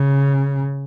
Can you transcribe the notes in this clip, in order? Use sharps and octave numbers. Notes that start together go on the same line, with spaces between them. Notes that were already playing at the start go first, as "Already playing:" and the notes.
Already playing: C#3